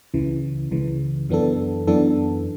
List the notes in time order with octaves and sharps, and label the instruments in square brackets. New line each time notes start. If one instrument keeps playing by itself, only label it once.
[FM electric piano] C#2 C#3 E3
C#2 C#3 E3
F#2 E3 B3 D4 A4
F#2 E3 B3 D4 A4